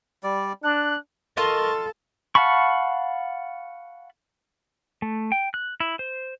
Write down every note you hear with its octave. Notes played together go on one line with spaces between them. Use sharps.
G3 D5
D4 A5 F#6
F4 A4 A#4 D#5 C6 C#6
F5 F#5 A5 B5 C#6
A3
G5
F#6
E4
C5